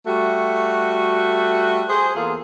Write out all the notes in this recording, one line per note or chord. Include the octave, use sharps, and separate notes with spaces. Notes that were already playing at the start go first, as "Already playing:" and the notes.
G3 A3 F#4
G#4 C5
E2 A#3 F4 G#4 A4